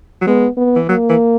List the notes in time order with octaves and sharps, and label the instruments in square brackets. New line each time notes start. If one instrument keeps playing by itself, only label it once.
[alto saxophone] F#3
[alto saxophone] G#3 [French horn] B3
[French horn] B3
[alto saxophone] E3
[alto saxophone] F#3 [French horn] A#3
[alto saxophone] E3